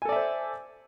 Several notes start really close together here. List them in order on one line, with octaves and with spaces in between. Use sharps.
G#5 A4 D5 E5 C5